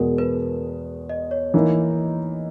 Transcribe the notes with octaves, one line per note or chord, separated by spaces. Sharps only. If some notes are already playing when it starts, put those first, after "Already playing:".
Already playing: E2 B2 G#3 A#4
B4
D#5
C#5
E3 A#3 D#4